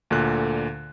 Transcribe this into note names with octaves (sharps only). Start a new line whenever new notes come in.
D2 A#2 D3 F#6